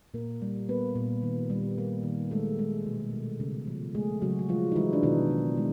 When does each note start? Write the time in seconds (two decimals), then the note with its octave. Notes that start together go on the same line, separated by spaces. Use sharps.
0.14 A#2 A#3 A#4
0.42 G3
0.69 A#3 B3 B4
0.96 A#2
1.23 D#3
1.50 G3
1.78 A#3
2.04 D#3
2.31 G#3 A3 A4
2.59 G#3
2.86 B2
3.13 B2
3.40 C#3
3.67 F3
3.95 G#3 A3 G#4
4.22 C#3 F#3 F#4
4.39 F#4
4.49 F3 G#3 F4
4.72 D#4
4.76 E3 G#3 E4
4.93 D4
5.03 B2 D#3 D#4
5.31 B2
5.57 G#3